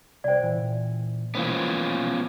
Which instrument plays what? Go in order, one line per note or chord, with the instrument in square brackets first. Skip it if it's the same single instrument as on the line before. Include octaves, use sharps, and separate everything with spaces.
[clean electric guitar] C2 G5 [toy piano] C5 D5
[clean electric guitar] A#2 E3
[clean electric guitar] B2 E3 A#3 [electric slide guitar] B3 C#4 F4 [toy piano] C5